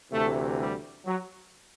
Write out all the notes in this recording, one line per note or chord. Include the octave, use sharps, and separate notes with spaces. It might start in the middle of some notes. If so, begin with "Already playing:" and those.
D2 C3 E3 A3
G3
F#3